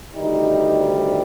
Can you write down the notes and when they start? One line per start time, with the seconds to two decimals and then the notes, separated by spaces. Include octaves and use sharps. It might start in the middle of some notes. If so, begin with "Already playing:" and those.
0.14 D2 C3 D#3 G3 D#4